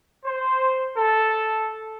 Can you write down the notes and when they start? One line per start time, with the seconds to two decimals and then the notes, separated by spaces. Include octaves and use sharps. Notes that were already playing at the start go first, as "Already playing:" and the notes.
0.25 C5
0.97 A4